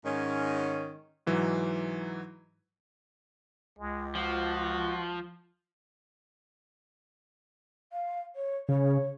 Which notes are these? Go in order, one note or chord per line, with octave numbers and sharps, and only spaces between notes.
G#2 D#3 C#4
G#2 E3 F#3 D#4
C#2 G#3
F3 F#4
F5
C#5
C#3 C#5